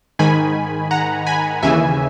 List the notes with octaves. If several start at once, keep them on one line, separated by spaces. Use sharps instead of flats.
G#2 D#3 G#5 B5
F#5 A#5
G#5 B5
D#2 C#3 E3 E5 G#5